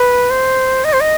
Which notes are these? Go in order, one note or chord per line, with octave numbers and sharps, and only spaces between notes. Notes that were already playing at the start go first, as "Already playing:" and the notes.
Already playing: B4
C5
D#5
C5
D#5